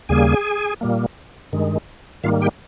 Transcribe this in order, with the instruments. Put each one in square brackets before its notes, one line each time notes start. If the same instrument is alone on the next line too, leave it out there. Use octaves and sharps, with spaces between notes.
[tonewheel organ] D#2 C#3 G3 A#3 G#4 G#5
A#2 G3 A#3
G2 D#3 G#3
G#2 D#3 G3 A#3 F4 F5
G4 G5